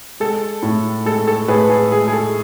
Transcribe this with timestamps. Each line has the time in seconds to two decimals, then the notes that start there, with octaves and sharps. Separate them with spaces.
0.20 G#3 A4
0.63 A2
1.05 G#3 A4
1.28 A4
1.48 A2 G#4 B4
1.70 G#4
1.91 G#3 G#4
2.08 G#4
2.13 A4